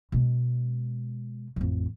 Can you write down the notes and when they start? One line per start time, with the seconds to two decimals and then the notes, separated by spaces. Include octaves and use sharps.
0.12 B2 G#3
1.56 A1 F2